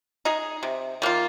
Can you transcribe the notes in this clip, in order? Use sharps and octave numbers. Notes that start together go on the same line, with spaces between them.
D#4 G#4
C3
D#3 A#3 F4